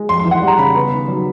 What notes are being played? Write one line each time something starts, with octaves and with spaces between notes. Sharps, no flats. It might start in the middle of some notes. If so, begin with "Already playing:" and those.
Already playing: G#3
F2 C6
C6
E3
F#5
G3
A#5
C#3 B5
B3
D#3
F#3